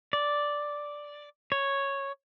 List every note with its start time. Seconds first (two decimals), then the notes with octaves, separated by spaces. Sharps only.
0.13 D5
1.52 C#5